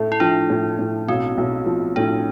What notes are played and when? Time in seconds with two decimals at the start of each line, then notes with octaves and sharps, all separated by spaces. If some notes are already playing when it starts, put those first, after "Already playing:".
Already playing: A2 A3 E4
0.12 E4
0.20 F3 D4
0.50 A2
0.79 A2
1.08 B1 C4
1.38 B1
1.66 F3
1.96 A2 D4